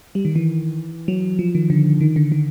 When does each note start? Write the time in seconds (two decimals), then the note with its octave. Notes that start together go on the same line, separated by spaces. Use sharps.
0.15 G3
0.25 D#3
0.36 E3
1.08 F#3
1.39 F3
1.55 D#3
1.70 D3
2.01 D#3
2.16 D3
2.32 D#3